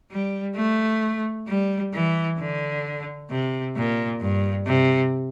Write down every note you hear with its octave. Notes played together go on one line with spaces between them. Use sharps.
G3
A3
G3
E3
D3
C3
A#2
G2
C3